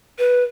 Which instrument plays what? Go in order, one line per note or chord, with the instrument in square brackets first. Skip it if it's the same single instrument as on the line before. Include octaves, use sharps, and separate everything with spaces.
[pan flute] B4